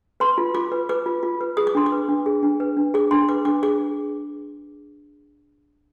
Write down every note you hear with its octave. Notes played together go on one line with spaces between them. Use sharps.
B4 C6
F4
F4 D6
B4
B4 D6
F4
F4
B4
G#4 D#6
D6
D4 C6
D6
B4
D4
G#4
D4
B4
D4
G#4 D6
D4 C6
B4 D6
D4 D6
G#4 D6